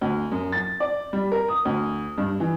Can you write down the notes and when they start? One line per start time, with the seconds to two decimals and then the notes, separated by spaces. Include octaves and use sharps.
0.01 D2
0.32 F#2
0.52 A6
0.80 D5
1.13 G3
1.32 A#4
1.48 D#6
1.65 D2
2.18 G2
2.40 E3